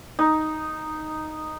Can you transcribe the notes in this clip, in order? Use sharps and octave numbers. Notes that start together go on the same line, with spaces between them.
D#4